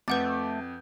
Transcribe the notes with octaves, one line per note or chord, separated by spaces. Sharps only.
F2 A3 B4 F#5 D6 G6 A6